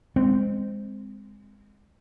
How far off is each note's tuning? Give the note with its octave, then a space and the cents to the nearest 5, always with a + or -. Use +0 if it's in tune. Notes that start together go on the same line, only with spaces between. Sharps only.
G#3 -20 C4 -10